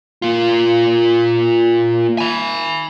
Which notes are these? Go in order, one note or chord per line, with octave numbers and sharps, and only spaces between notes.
A#3 F4
G#5 B5